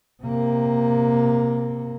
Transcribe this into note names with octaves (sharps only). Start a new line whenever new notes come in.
C3 A#3